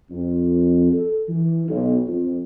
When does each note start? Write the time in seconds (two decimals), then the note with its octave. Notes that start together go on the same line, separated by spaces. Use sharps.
0.10 F2
0.92 A4
1.28 E3
1.68 B1
2.07 F2